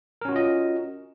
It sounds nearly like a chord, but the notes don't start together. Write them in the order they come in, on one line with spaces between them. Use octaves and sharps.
A#4 C#4 F#4 F4 D#5